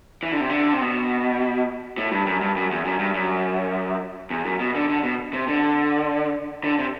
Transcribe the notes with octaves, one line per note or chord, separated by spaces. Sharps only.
E3
D3
C3
D3
C3
B2
A2
G2
F#2
G2
F#2
E2
F#2
G2
F#2
E2
F#2
B2
D3
D3
B2
C3
D3
D3
C3